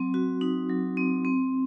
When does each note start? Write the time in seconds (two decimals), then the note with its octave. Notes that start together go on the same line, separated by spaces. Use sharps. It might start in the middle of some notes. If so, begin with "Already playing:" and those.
Already playing: F#3 C4
0.14 F#4
0.41 D#4
0.69 F#3
0.97 C4
1.25 C4